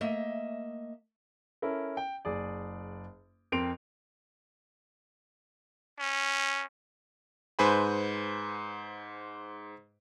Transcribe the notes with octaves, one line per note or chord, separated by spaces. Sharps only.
A3 A#3 D#5 E5
C#4 E4 A4 A#4
G5
F#1 G#4 D5
F2 C4 A#4 C6 D7 F7
C#4
G#2 B4 C5 G#5 B5